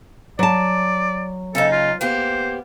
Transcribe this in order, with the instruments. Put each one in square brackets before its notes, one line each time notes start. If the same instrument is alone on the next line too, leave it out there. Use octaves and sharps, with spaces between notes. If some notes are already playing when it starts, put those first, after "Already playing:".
[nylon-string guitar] F#3 A5 [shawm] D5
[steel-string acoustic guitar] C#3 A#3 D#4 [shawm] A4
[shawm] F4
[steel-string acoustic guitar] A#3 B3 G4 [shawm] C5